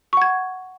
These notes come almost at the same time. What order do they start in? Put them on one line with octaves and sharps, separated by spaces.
C#6 F#5 G#6